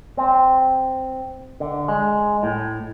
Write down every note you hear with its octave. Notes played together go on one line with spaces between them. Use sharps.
C4
D3
G#3
A2